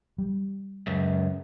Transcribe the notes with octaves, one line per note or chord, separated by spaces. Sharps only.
G3
C#2 F#2